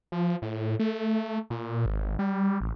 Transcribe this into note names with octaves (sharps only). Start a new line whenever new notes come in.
F3
A2
A3
A#2
G#1
G3
A1